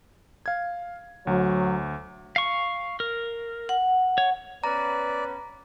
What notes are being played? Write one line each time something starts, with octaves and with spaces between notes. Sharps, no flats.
F5 G#6
D2 F#3
F5 C#6
A#4
F#5
C#5
B3 C#4 B4 D5 A#5